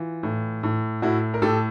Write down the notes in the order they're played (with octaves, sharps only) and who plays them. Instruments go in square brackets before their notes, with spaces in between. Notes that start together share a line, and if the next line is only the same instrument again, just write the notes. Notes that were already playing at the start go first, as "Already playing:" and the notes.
Already playing: [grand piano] E3 F4
A2
A2
A2 E4 F#4
A#4
A2 G4 A4